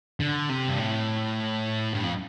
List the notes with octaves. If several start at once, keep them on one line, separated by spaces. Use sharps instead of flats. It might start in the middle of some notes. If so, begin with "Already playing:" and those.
D3
C3
G2
A2
G2
F2